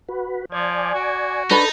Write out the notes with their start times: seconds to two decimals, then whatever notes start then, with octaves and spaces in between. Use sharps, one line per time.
0.09 F#4 B4
0.52 F3 D5 G#5
0.94 F#4
1.51 D4 D#4 A4 B4 A5 B5